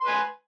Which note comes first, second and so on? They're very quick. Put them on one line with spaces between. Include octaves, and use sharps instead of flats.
C6 B4 G#5